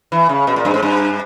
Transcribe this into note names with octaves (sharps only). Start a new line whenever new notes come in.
E3
C#3
B2
A#2
G2
G#2
G2